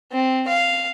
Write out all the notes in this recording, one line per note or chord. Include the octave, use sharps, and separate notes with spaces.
C4
F5